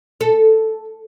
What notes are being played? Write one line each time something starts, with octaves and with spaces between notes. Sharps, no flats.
A4